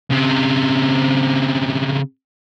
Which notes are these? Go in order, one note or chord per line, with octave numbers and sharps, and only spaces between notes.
C#3 C4